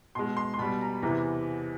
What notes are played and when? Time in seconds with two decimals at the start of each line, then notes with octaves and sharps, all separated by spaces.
0.15 B2 G#3 C6
0.37 C6
0.54 C6
0.58 B2 G3 B5
0.81 A#5
1.02 E2 C3 E3 A#5